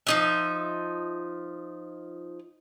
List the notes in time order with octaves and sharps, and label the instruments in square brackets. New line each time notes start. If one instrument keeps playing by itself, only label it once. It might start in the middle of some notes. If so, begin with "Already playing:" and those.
[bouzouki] F3 D#4 E5